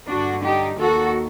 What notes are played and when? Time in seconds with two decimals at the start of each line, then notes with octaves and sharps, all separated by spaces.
0.08 G2 D3 D4 F#4
0.44 D#4 G4
0.79 D#2 D#3 F#4 A4